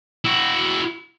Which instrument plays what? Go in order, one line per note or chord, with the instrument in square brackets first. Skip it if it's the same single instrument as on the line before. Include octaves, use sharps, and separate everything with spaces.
[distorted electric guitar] E4 F#4